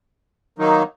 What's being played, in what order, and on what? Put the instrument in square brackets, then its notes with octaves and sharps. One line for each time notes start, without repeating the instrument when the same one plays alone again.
[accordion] D#3 F#3 A#3 D#4